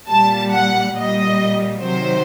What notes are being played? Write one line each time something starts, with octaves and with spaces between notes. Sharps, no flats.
A#2 G3 A5
F#5
A#2 G3 D#5
C3 D#3 F#3 C5